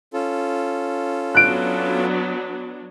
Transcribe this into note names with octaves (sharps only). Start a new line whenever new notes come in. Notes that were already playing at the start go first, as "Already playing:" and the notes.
C#4 F4 A4
F#3 B3 D4 F#6 D7